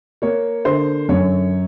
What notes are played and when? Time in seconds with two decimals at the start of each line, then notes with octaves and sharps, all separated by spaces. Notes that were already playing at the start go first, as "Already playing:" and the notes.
0.22 A#3 C#5
0.65 D3 C5
1.09 F#2 C#5